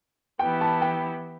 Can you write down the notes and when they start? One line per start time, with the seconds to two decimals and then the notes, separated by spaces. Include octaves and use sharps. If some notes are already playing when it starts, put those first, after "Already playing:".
0.39 E3 B3 E4 G4 G5
0.61 A5
0.82 G5